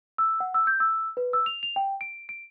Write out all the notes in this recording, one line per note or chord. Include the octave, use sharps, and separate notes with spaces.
E6
F#5
E6
G6
E6
B4
E6
F7
F7
G5
D7
D7